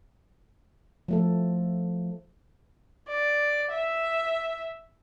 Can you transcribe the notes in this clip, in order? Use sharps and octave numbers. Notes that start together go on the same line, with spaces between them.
F3 A3 A4
D5
E5